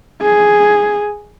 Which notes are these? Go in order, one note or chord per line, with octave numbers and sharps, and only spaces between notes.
G#4